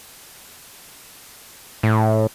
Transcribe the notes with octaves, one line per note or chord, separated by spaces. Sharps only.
A2